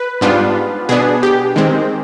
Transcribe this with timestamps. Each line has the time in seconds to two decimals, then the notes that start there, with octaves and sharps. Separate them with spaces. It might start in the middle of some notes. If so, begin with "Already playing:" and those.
Already playing: B4
0.21 G#2 G3 B3 D4 F4
0.89 B2 B3 D4 G#4
1.23 G4
1.56 D#3 G#3 C4